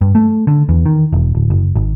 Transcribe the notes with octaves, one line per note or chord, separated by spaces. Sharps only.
G2
A3
D3
E2
D#3
E1
D1
F#1
G#1